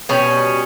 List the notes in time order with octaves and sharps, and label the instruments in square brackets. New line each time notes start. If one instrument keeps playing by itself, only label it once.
[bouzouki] B2 G3 C#4